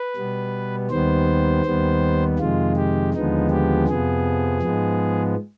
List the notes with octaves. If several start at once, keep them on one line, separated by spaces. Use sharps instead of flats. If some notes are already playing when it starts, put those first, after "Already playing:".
Already playing: B4
B2 G3 B3
D#2 D#3 G3 B3 C5
D#2 D#3 G3 B3
F2 C3 D#3 G#3 F4
G4
D#2 D3 F3 G#3 B3 D#4
G4
F2 C3 F3 B3 G#4
G#2 F3 G#3 B3